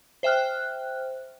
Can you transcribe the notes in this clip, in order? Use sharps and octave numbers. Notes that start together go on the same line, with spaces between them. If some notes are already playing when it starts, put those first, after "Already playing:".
C5 E5 G5 F6 F#6